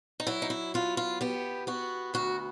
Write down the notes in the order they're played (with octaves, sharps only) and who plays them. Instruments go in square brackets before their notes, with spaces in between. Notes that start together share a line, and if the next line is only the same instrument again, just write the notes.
[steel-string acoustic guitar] D#4
F#3 E4
D#4
E4
B3 F4
F4
B3 G4
B3 F#4
D2 F#4